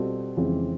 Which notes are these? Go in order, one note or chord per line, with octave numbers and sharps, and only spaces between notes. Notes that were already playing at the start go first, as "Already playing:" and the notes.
Already playing: B2 G3 C4 F4 A4
F2 C#3 E3 G#3 C4